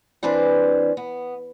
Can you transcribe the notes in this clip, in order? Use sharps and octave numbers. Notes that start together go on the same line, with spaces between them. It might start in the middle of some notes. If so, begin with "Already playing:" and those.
E3 C4 D4 B4 C5
B3